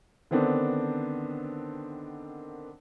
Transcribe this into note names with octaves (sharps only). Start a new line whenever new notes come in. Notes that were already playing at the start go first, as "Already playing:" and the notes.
D3 D#3 B3 C4 D4